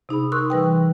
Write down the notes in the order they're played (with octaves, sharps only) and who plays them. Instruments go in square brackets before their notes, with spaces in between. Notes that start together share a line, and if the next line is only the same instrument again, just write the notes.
[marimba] C3 D#4 G#4 B5
A#4 C6 C#6 D#6 E6 F#6
E3 G3 B4 G5